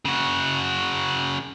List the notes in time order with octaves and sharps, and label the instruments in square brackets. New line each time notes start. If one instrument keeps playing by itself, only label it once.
[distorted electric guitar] C#3 F#4